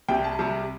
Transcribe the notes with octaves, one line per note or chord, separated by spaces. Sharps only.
C2 C3 G3 G5
A5
C2 C3 G3